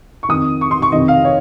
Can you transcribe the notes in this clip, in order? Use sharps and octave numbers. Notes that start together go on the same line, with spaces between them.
C#6
F2 D#3 D#6
C#6
C6
C#6
F2 C3 D#3 D#5
F5
C#5